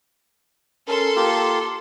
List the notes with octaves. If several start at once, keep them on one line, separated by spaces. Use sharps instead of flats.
C#4 A4 A#4 C6
A#3 F4 G4 A#4